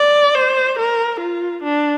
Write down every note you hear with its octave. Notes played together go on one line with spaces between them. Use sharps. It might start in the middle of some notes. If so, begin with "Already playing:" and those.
Already playing: D5
C5
A#4
F4
D4